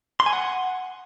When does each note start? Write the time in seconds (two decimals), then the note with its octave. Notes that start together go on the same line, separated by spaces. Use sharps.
0.20 C6
0.26 G#5
0.33 F#5